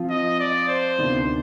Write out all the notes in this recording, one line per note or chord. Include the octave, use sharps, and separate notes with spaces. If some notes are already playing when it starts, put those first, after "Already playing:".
Already playing: F3 C4 F4
D#5
D5
C5
D2 C3 D#3 B3 D4